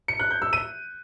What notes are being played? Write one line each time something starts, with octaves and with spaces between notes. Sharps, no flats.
C#7
F#6
G6
E6
D#7